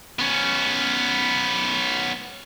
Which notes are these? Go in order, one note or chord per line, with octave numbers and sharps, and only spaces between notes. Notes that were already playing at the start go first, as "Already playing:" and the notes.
B3 C#4